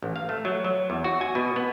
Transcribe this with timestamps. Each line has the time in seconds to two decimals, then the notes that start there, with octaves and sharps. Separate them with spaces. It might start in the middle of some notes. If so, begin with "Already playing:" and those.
0.02 A1
0.16 F5
0.29 A3
0.45 F#3
0.64 F#3
0.90 E2
1.04 F#4
1.21 G#5
1.35 B2
1.56 B3